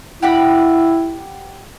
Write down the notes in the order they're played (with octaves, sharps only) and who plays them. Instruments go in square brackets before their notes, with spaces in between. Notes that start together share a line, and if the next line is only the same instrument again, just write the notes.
[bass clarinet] E4 [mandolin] G4 F#5 B5